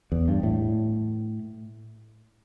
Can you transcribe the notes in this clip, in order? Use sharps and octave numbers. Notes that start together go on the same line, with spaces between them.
E2
G2
A2